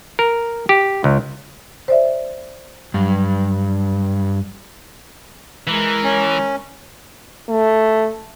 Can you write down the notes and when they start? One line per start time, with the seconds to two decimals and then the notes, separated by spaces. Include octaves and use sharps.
0.19 A#4
0.69 G4
1.04 C#2
1.88 C5 D5 E5
2.94 G2 F#3
5.67 E3 G#3 A#4
6.04 C#4
7.49 A3